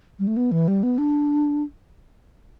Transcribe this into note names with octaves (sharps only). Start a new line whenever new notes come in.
G3
A3
B3
E3
G3
B3
D4